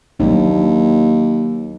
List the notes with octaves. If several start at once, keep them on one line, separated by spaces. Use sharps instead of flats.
D#2 F#3 A#3 D4